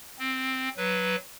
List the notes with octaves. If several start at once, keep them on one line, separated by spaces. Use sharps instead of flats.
C4
F#3 B4